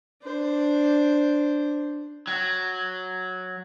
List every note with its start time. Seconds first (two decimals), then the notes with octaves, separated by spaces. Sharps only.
0.22 D4 C5
2.27 F#3